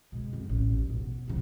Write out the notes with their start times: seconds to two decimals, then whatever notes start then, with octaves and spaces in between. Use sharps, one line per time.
0.12 B2 G#3
0.33 F2
0.49 A1
0.76 D#2
0.90 B2
1.28 C3 F#3